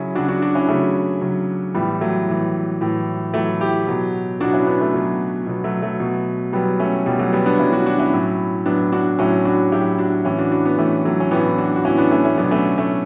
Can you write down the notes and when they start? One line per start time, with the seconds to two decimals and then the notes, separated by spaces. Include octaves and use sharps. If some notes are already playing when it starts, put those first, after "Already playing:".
Already playing: C#3 F#3 C#4 E4
0.15 C#3 F#3 D4 F#4
0.28 D4 F#4
0.42 D4 F#4
0.55 C#4 E4
0.68 C#3 F#3 A3 C#4
1.21 C#3 F#3
1.74 A2 E3 G3 B3
2.01 F#3 A3
2.28 A2 E3
2.81 A2 E3
3.34 A2 E3 F#3 A3
3.61 E4 G4
3.87 B2 F#3
4.40 B2 F#3 D4 F#4
4.53 C#4 E4
4.67 B3 D4
4.80 A3 C#4
4.94 B2 F#3
5.47 B2 F#3
5.64 F#3 A3
5.82 F#3 A3
6.00 B2 F#3
6.53 B2 F#3 G3 B3
6.80 A3 C#4
7.06 B2 F#3 G3
7.19 F#3 A3
7.33 G3 B3
7.46 B3 D4
7.59 B2 F#3 C#4 E4
7.73 D4 F#4
7.86 D4 F#4
7.99 C#4 E4
8.13 A2 F#3
8.66 A2 F#3 B3 D4
8.92 D4 F#4
9.19 A2 F#3 C#4 E4
9.45 D4 F#4
9.72 A2 F#3 E4 G4
9.99 D4 F#4
10.25 A2 E3 C#4 E4
10.38 D4 F#4
10.52 D4 F#4
10.65 B3 D4
10.78 A2 E3 A3 C#4
11.05 F#3 A3
11.20 C#4
11.31 A2 E3 B3 D4
11.58 D4 F#4
11.76 F#4
11.85 A2 E3 C#4 E4
11.98 B3 D4
12.11 A3 C#4
12.25 A3 C#4
12.38 B2 F#3 B3 D4
12.51 A3 C#4
12.78 A3 C#4